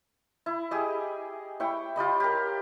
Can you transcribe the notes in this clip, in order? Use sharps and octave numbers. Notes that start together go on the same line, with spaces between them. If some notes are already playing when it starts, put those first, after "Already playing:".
E4
G4 G#4 D#5
E4 C#5 G5
F4 G4 D#5 B5
G4 A#4